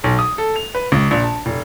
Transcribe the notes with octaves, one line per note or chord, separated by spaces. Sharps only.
B1
D#6
A4
F7
B4
C#2
A#1
A5
F1